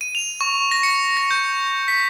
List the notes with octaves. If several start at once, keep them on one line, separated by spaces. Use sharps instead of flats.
D#7
F7
C#6
A#6
C#7
A#6
G6
B6